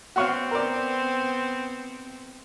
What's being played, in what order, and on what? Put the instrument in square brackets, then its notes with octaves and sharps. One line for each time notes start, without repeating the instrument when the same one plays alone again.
[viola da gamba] B3 C4 [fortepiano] F#4 C#5 F5
[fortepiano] A#4 D5